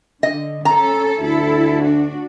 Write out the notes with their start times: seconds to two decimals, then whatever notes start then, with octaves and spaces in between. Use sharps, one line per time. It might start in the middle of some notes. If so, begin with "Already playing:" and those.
0.23 D3 D#5
0.65 C#4 A4 A#5
1.20 D2 E4 A4
1.82 D4 F#4